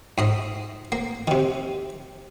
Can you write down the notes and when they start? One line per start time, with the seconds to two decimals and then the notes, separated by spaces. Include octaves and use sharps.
0.18 G#2 D#4 D#5
0.92 A#3
1.28 C3 D#3